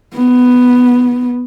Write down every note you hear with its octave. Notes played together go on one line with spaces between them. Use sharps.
B3